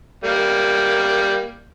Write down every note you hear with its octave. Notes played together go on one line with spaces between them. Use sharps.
G3 A#3